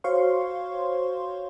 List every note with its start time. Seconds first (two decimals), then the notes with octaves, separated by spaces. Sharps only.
0.04 F#4 C5 C#5 F5 C6 C#6